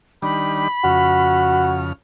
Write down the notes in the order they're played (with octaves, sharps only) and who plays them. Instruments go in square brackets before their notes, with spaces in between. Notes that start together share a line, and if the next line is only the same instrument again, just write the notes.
[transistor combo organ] D#3 G3 D4 [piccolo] B5
[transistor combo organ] F2 C#3 F6 [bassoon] F#4